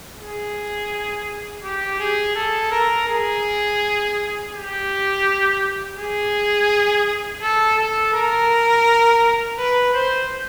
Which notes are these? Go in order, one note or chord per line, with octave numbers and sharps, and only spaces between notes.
G#4
G4
G#4
A4
A#4
G#4
G4
G#4
A4
A4
A#4
B4
C5